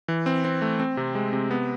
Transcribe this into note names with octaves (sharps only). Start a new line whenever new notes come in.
E3
C4
C4
A3
C4
C3
G#3
C3
B3